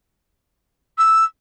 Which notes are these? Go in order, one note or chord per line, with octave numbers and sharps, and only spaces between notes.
E6